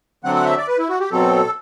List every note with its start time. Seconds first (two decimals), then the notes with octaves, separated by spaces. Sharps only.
0.24 D3 F#3 A3 C4 F#5
0.35 F#5
0.46 E5
0.57 D5
0.68 B4
0.79 E4
0.89 F#4
1.00 G4
1.11 B2 F#3 C4 A4